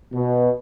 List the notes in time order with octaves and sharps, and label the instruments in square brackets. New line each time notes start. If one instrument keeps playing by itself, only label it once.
[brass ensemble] B2